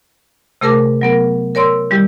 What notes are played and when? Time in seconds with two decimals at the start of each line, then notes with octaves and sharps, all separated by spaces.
0.61 C3 A3 G#4 A#4 A5 D6
1.01 F#3 B3 A#4
1.55 A#4 C#5 D5 C6 E6
1.91 D#3 G3 E4 G4